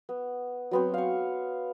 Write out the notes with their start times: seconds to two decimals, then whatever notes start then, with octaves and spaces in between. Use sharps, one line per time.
0.09 B3
0.71 F#3 B3 C4
0.94 F5 C#6